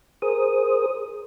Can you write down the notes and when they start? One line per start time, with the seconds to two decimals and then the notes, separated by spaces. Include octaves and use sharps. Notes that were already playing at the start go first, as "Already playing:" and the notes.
0.22 G#4 A#4 C5 D#6